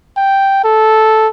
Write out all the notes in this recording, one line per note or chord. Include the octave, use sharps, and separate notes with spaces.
G5
A4